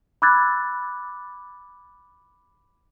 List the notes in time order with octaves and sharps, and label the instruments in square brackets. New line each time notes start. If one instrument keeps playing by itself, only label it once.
[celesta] B5 D6 E6 F#6 G#6 A6